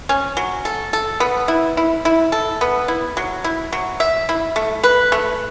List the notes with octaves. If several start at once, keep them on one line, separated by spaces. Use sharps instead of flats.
C#4
F#3
A4
A4
B3
E4
E4
E4
A4
B3
E4
F#3
E4
F#3
E5
E4
A3
B4
A3